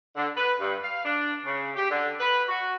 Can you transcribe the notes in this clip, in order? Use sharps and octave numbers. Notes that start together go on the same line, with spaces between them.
D3
B4
G2
F5
D4
C#3
G4
D3
B4
F#4